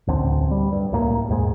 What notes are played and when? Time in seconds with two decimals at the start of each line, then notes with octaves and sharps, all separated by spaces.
0.07 A1 D2 D3 C4
0.51 G3
0.72 G2
0.92 C#2 A2 A#3
1.29 D#2 G#2 G#3